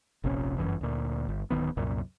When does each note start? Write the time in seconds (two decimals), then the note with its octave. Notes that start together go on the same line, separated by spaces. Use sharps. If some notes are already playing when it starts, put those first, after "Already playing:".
0.24 F1 A#1 C3 C#4
0.58 G1 C2 F#2 E3
0.81 D2 A#2
1.29 G1
1.50 D1 G#1 D#3 B3
1.77 C2 F#2 A#2